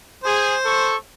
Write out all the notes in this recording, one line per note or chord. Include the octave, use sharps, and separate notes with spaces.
G#4 C5
A4 C#6